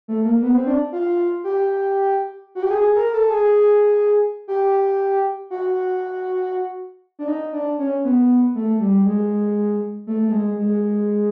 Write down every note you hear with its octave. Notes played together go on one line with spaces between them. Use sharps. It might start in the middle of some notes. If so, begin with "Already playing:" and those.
A3
A#3
B3
C4
D4
F4
G4
F#4
G4
G#4
A#4
A4
G#4
G4
F#4
D4
D#4
D4
C#4
B3
A3
G3
G#3
A3
A3
G#3
G#3